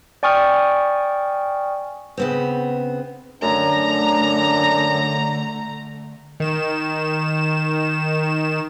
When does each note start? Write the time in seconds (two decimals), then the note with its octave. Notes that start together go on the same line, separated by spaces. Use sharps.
0.23 D5 G5 G#5 C#6 D#6 F6
2.17 C#3 B3 C4
3.42 F#2 D3 A3 D4 A#5
6.40 D#3 E7